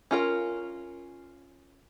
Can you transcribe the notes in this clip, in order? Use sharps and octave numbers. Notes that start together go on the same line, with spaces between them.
C#4 F4 A#4